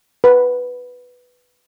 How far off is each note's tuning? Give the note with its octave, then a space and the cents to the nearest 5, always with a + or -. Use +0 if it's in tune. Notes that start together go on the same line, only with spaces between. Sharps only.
B4 +0